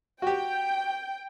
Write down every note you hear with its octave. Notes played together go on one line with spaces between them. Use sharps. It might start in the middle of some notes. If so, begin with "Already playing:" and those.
F#4 G4 G5